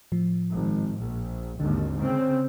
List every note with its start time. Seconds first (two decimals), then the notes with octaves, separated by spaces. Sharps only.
0.12 A2 F3
0.54 G#1
1.00 A#1
1.60 G#1 D#2 D3
2.00 C#3 C4